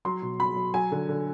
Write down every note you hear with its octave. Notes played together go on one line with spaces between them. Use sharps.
F#3 C6
B2
B2 B5
F#3
F#3 G#5
D3
D3